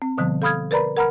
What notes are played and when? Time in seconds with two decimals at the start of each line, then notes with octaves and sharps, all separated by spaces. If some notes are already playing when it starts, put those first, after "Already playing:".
0.02 C4
0.18 B2 D3 F3 G3 B3
0.42 A4 F5 B5 D#6 F6 G#6
0.71 A#4 B4 D5 A#5 B5
0.96 A#4 F#5 A#5 B5 F6